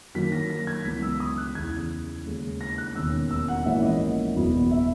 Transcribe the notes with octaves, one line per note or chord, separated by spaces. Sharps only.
F#2 D#3 F#3 A#3 B6
A#6
A#6
G#6
C#2 C#3 E3 B3 B6
E6
D#6
F#6
E2 C#3 E3 G#6
D#2 C#3 G#3 C#4
A#6
F#6
E1 D#2 D#3 A#3 C#4 E6
E6
F#5
A#1 G#2 E3 A#3 C#4 E5
D#5
F#1 E2 B2 F#3 B3
E5